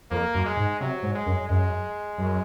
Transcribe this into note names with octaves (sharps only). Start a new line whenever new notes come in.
F2 A#3
F#2
G#3
G#2
C3 F#3
G#2
G#3
F#2
F#2 G#3
F#2